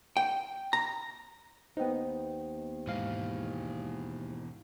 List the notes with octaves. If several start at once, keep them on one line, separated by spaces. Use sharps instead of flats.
G5
A#5
D#2 B3 D#4 C5 G5
G#2 B2 E3 F5